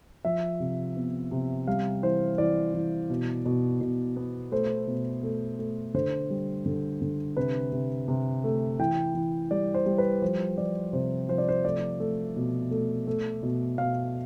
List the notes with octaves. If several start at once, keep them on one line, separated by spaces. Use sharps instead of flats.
F3 E5
C3
B3
C3
G3 F5
E3 C5
E3 D5
E3
B2
B2
B2
B3
A3 C5
B2
A3
A3
D3 C5
G3
D3
D3
C3 B4
C3
C3
A3
E3 G5
E3
G3 D5
C5
G3
B4
F3 C5
F3 D5
C3 C5
F3 C5
D5
C5
A3 D5
A3
B2
A3
A3
B2
B2 F5